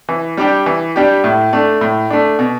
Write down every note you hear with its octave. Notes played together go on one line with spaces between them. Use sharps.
E3
G3 D4 G4
E3
G3 D4 G4
A2
A3 D4
A2
A3 D4
B2